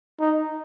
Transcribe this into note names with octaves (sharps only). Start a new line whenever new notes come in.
D#4